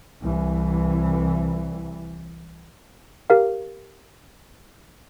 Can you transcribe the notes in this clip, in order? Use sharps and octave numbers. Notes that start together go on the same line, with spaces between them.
C2 E3
G4 A#4 F5